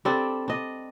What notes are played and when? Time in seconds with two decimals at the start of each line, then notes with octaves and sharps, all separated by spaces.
0.05 G3 C4 D4 A4
0.48 D4 D#5